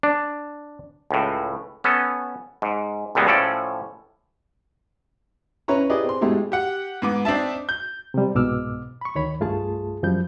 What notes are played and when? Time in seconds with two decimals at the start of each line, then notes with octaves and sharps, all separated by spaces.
0.03 D4
1.11 C#2 A2
1.84 B3 C#4 A4
2.62 G#2
3.15 C#2 A#2 G3 G#3 B3
3.27 A2 F3 C#4 A4 D5
5.68 C#4 E4 B4 C#5 A#5
5.90 E4 G4 G#4 B4 D5 D#5
6.05 C4 C6
6.21 G#2 B2 G#3 A3 E4 G4
6.52 G4 F#5
7.02 G#2 B3 D6
7.25 C4 D4 D#4 E5 A5
7.69 G6
8.14 C3 G3
8.35 C2 G#2 B2 D6 E6 F6
9.01 B5 C#6
9.15 D2 D#3 C#5 B5
9.40 C2 G2 A3 F4 G#4 A5
10.03 F#2 F3 G3 G6